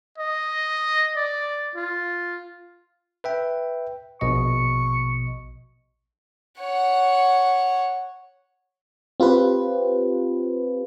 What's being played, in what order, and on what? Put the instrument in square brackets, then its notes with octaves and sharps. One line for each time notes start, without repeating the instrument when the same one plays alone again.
[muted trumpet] D#5
D5
F4
[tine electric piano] B4 E5 G5
[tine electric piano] A#1 B2 D#5 [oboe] C#6
[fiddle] C#5 F#5
[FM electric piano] C4 F4 G4 B4